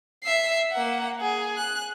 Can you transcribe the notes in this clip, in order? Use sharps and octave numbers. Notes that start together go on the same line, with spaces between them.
E5 C7
A#3 F#5
G#4
F#6